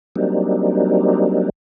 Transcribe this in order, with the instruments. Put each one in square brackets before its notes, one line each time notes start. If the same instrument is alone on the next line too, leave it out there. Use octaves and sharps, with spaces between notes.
[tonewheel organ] F#3 G3 A#3 C4 D4 D#4